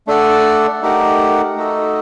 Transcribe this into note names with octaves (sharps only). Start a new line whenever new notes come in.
A3 D4 A4 D5 F#5
A3 D#4 G4 A#4 F#5
A3 D#4 F#4 A4 D#5